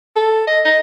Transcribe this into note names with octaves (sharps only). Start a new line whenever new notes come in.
A4
D#5
D#5